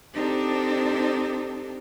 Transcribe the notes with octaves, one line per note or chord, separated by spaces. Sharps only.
C4 D4 D#4 G4 A4 C5